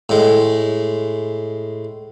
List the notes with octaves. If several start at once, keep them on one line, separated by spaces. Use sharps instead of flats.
A2 G#3